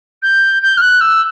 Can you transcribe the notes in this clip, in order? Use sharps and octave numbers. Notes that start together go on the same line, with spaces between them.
G6
G6
F6
F#6
E6